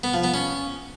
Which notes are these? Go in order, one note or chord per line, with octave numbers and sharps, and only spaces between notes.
B3
F3
B3
C#4